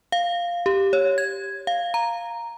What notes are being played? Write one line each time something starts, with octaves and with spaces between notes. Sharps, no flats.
F5
G4
C#5
G#6
F5
A#5